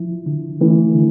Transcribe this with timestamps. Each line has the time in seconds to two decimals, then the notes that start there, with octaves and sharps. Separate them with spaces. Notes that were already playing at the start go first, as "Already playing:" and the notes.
Already playing: F3 E4
0.26 D3
0.60 E3 A3
0.95 D3